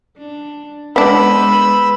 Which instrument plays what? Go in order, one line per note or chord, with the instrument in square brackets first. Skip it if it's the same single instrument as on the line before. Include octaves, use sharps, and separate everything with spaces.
[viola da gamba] D4
[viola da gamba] G#3 B4 C5 [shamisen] B3 D4 [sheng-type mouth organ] B5 E6